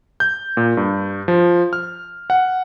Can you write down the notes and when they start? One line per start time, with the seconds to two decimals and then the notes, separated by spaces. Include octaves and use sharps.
0.20 G6
0.57 A#2
0.77 G2
1.28 F3
1.73 F6
2.30 F#5